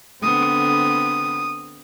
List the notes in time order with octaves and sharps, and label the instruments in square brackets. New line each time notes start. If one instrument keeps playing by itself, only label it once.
[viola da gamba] D3 B3 C4 [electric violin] D#6